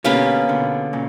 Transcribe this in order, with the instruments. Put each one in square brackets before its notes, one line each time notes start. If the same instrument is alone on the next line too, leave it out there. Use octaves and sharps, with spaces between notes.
[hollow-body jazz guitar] B2 D3 [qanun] A#3 C#4 G4 B4
[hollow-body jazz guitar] B2 D3
A#2 C#3